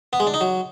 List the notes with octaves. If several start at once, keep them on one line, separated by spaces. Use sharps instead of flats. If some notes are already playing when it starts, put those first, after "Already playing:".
B3
G#3
D4
D#4
F#3